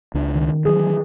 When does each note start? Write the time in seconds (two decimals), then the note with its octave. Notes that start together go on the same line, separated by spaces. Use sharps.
0.14 C#2 D4
0.35 D#3
0.65 D#3 E3 F#3 G#4